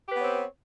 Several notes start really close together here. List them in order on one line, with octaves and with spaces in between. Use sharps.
G4 B4 B3 C#5 C4